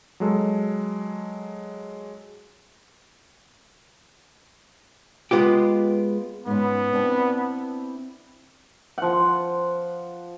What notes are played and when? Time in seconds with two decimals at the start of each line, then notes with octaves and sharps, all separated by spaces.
0.20 F#3 G#3 A4
5.31 G#3 B3 F4 G4
6.46 G#2 B3 C#4
6.93 C4 D4 E4
8.98 F3 F#5